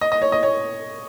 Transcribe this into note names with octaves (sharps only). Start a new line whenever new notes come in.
D#5
D#5
C#5
D#5
C#5